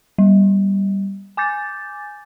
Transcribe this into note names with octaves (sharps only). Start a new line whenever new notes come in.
G3
G#5 D6 G6 A6